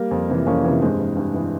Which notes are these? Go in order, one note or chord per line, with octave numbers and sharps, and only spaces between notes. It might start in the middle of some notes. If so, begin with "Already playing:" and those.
Already playing: G3 A#3
F2
C3 E3
F2 A#3 C#4
C3 E3
G2 G#3 C4
E3
G2
E3